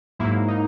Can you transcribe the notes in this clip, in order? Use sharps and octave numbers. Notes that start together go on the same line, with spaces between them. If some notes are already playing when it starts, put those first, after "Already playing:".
G#2 F#3 A#3 E4
D#4